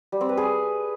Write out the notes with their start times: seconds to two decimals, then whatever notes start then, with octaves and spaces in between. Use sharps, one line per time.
0.12 G3
0.21 C4
0.29 B4
0.37 G#4